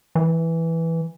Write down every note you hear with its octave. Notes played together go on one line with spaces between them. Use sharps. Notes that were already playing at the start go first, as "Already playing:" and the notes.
E3